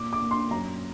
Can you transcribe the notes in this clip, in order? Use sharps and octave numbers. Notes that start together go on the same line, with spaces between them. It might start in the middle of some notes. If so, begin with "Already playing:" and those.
Already playing: A#2 D6
D6
A#2
C6
F#2 A#5